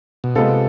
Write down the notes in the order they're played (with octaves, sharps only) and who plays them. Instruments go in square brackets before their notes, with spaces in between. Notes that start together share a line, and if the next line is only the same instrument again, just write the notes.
[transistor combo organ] B2
[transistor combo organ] C3 [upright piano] G#3 B3 F4 A4